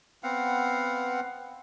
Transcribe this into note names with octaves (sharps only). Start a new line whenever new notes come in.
B3 C4 F5 F#5